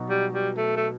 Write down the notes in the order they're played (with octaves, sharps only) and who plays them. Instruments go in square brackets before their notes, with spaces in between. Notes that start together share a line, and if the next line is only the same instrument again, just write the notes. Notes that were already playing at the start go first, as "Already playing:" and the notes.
Already playing: [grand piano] B2 F#3 B3 D#4 F#4
[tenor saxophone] G3
G3
A3
A3